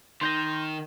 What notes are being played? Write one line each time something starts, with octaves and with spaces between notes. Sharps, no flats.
D#3 D#4 C6 G6 A#6